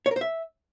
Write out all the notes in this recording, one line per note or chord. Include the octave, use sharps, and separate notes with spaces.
C#5
A#4
C5
E5